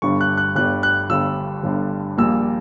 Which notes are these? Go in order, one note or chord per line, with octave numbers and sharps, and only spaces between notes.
G1 G2 D3 G3 C#6
F#6
F#6
G1 G2 D3 G3 F#6
F#6
G1 G2 D3 G3 E6
G1 G2 D3 G3
A#1 A#2 G3 E6